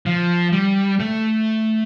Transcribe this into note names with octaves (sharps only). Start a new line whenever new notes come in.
F3
G3
A3